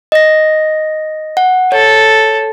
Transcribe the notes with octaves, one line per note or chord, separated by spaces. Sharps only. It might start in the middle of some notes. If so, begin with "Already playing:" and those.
D#5 A#6
F#5
A4 C#5